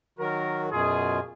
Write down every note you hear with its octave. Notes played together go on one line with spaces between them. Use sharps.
D#3 F#3 F#4 A#4
F#2 B2 F4 G#4